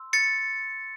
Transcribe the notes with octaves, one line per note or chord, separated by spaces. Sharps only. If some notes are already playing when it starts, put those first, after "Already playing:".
Already playing: C6 E6
A6 C#7